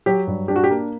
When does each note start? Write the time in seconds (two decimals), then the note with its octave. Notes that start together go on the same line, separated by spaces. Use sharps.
0.06 F#3 G4
0.27 G2
0.48 D4 G4
0.56 F#4
0.64 G4
0.70 A#3